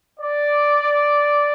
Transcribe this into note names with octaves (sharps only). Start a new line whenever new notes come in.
D5